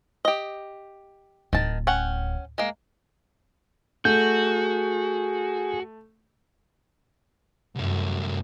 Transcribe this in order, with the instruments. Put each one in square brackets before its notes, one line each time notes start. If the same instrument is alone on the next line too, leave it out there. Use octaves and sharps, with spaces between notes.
[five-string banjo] G4 D#5
[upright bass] D1 [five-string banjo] D#3 A5
[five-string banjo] C#4 F#5 G5
G#3 A#3
[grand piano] A3 [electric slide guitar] F#4 [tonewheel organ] G#4 [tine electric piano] G6
[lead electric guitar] C2 A3 [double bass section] F#2